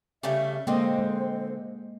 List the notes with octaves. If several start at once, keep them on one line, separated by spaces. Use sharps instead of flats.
C#3 G3 A3 E5
D3 G#3 A#3 C4 C5 D#5
G#3